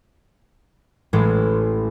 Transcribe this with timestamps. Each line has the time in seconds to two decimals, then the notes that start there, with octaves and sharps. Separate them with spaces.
1.13 A1 A2 E3 G#3